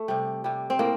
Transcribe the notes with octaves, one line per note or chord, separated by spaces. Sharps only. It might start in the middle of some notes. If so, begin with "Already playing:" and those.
Already playing: A3
C3 G3
C3 G3
C4
A2 A#3